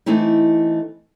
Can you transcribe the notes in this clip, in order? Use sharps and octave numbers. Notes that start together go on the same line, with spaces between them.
E3 A3 C4 D#4 E4